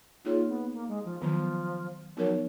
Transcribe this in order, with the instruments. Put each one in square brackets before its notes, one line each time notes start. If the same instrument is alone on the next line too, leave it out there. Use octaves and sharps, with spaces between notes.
[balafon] A#3 D#4 G#4 C#5 [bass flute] F4
[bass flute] B3
A#3
G#3
F3
[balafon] D#3 F#3 B3 [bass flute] F3
[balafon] F3 B3 D#4 A#4 C#5 [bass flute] F#3